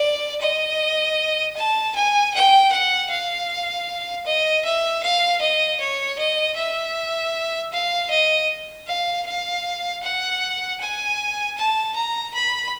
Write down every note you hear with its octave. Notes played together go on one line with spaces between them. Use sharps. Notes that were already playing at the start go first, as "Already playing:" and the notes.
Already playing: D5
D#5
A5
G#5
G5
F#5
F5
D#5
E5
F5
D#5
C#5
D#5
E5
F5
D#5
F5
F5
F#5
G#5
A5
A#5
B5